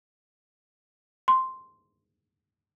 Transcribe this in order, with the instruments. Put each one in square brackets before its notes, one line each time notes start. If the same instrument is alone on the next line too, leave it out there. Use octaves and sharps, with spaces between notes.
[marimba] C6